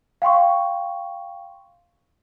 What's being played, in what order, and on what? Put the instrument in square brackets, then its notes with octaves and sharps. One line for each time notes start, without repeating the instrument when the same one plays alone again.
[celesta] F5 G5 C6 C#6